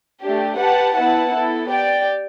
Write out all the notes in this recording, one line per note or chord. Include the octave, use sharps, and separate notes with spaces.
A3 D4 G4
G4 B4 F#5 A5
B3 E4 B4 F#5 A5
B3 E4 A4
G4 D5 G5